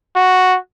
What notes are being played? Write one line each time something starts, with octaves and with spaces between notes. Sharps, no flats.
F#4